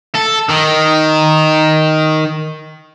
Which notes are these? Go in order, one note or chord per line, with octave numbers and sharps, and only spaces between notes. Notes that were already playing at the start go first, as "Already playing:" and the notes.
A4
D#3